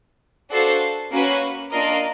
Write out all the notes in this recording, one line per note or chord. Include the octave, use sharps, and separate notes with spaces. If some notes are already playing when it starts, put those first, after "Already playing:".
D4 F#4 A4 C5 F5
A#3 C#4 F#4 B4
A#3 D4 F4 A#4 D#5